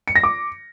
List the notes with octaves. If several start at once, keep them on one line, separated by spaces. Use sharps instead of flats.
C#7
A#6
D6